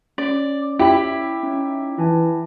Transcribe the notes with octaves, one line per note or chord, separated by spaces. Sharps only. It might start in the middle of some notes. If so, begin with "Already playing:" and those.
C#4 D5
E4 G4 B5
C#4 D#4
E3 E4 G#5 A5